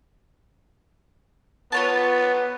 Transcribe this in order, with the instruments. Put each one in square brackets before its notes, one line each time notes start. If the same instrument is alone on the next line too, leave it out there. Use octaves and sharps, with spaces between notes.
[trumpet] B3 [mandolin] F4 C#5 A5